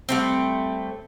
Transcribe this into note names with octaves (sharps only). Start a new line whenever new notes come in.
G3 A3 C4